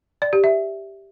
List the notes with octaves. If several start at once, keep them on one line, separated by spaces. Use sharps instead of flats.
D5
G4
E5